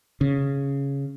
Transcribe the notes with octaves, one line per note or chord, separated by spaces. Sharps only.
C#3